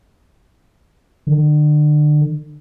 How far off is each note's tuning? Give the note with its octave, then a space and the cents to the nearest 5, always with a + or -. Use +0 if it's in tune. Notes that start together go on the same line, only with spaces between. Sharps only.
D3 +35